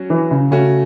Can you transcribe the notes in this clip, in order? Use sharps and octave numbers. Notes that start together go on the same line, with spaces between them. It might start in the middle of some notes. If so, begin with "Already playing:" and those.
Already playing: F#3 C#4 F#4
E3
C#3
C#3 A3 C#4 F#4